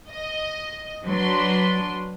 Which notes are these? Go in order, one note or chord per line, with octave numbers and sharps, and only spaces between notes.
D#5
F#3 D4 B4 C6